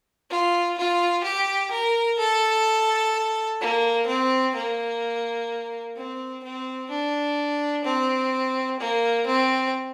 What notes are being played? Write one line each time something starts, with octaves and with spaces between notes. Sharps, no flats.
F4
F4
G4
A#4
A4
A#3
C4
A#3
C4
C4
D4
C4
A#3
C4